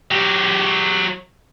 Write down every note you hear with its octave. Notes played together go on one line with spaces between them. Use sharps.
F#3 G4